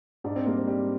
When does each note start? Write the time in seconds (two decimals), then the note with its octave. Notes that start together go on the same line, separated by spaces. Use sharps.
0.24 G#2 D4
0.36 C4
0.46 G3 A#3
0.57 C4
0.68 G3